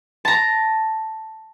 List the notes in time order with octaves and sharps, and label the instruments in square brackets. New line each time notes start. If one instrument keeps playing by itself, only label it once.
[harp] A5 A#5